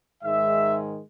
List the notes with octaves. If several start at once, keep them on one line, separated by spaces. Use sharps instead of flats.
G#2 D#3 G#3 E5